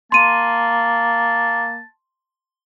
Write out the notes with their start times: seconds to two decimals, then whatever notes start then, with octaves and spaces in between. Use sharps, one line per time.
0.12 A#3 A5 C6 D#7